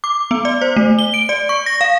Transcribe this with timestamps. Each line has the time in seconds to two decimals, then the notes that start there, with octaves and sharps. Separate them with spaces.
0.04 D6
0.31 B3
0.45 D5
0.62 C5
0.77 A3
0.99 G7
1.14 D7
1.29 D5
1.49 C#6
1.66 A#6
1.81 F5